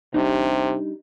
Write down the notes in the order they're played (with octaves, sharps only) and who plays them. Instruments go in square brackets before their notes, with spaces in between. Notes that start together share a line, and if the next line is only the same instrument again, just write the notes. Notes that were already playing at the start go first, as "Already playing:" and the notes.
[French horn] C3 [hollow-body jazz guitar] G3 D4 D#4